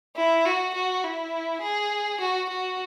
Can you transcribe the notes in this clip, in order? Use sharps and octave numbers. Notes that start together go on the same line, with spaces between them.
E4
F#4
F#4
E4
G#4
F#4
F#4